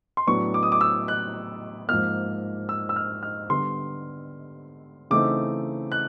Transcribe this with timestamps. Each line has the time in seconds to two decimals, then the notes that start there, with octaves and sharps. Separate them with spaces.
0.17 C6
0.27 A2 F#3 B3 D4 C#6
0.54 D6
0.63 D#6
0.72 D6
0.81 E6
1.08 F#6
1.89 G#2 F3 A#3 F6
2.69 E6
2.89 E6
2.96 F6
3.23 F6
3.50 D3 G3 B3 C6
5.10 C#3 E3 A3 C4 D#4 D6
5.92 F#6